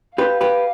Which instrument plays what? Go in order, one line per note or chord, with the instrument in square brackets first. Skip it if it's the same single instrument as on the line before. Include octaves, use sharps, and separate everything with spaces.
[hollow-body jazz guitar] G4 B4 [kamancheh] F5
[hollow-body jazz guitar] G4 B4